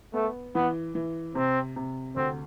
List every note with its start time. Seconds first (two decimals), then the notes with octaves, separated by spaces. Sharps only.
0.14 A3 B3
0.55 E3 B3
0.95 E3
1.35 C3 C4
1.76 C3
2.16 D2 C4